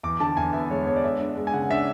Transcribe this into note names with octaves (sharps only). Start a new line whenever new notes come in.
E2 D6
D3 A5
E2 G#5
B3 E5
G#3 C#5
B3 C#5
D5
G#3 E5
D4
G#3
G#5
C#3 F#5
D4 E5